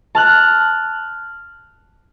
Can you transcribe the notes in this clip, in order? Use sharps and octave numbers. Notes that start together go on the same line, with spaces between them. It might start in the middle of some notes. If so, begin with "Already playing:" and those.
A5 F6 F#6